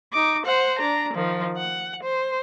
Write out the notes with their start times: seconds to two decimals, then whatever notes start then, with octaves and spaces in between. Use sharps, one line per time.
0.13 D#4 D6
0.46 C5 F#5
0.79 D4 A#5
1.14 D#3 F3
1.57 F#5
2.03 C5